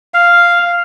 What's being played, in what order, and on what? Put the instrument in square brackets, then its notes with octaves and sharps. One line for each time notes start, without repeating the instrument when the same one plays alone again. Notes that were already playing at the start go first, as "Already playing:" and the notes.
[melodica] F5